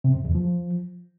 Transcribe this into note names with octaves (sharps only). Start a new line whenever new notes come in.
C3
F2
E2
F3